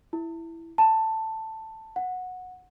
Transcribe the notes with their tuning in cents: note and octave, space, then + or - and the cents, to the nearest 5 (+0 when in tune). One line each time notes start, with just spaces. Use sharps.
E4 +5
A5 +10
F#5 -15